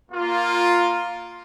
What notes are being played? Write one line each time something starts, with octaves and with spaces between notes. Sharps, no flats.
A#3 F4